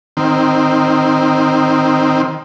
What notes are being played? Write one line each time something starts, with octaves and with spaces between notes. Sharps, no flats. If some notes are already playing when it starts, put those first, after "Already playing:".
D#3 C4